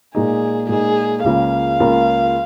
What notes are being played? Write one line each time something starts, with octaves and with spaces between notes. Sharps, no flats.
A#2 G#3 D#4 G#4
A#2 G#3 D#4 G#4
C#2 C#3 A#3 F4 A#4 F5
C#2 C#3 A#3 F4 A#4